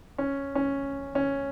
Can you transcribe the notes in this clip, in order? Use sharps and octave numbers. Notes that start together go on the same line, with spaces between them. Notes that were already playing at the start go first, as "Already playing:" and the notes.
C#4
C#4
C#4